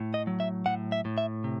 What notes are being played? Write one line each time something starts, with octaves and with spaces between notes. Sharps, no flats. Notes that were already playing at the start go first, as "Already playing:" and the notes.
Already playing: A2
D#5
F#3
E5
A2 F#5
E5
A2
E5
C3